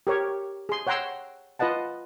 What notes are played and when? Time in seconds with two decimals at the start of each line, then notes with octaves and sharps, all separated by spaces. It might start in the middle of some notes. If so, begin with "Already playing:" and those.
0.07 G4 A#4 C#5
0.69 G#4 C6
0.87 C#5 F#5 G5 A#5 C6 E6
1.59 F4 B4 D#5 F#5 A5